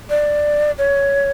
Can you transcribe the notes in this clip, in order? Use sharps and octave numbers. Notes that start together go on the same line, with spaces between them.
D5
C#5